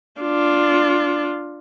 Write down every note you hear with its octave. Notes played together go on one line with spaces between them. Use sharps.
D4 F4